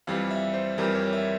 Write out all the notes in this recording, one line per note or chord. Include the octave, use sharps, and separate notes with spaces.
F2 E3 G3 F5
E5
C5
F2 E3 G3 A#4
C#5
E5